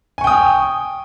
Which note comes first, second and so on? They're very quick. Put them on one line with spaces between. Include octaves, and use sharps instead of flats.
G#5 C#6 G5 D#6